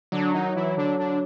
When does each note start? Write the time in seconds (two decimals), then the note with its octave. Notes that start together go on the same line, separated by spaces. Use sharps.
0.12 D3 F#3 D4
0.34 D#3 D#4
0.55 E3 E4
0.77 D3 D4
0.99 D3 D4